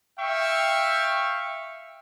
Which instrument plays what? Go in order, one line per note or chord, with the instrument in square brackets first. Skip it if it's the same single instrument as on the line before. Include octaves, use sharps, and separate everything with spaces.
[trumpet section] E5 F5 G5 C#6